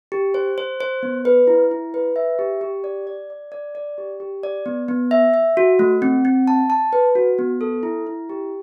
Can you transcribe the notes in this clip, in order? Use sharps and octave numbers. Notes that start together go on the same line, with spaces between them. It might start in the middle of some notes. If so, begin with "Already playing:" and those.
G4
C5
C5
C5
B3
B4
E4
E4
B4
E5
G4
G4
D5
D5
D5
D5
D5
G4
G4
D5
B3
B3
E5
E5
F#4
A3
C4
C4
A5
A5
B4
F#4
B3
A4
E4
E4
G4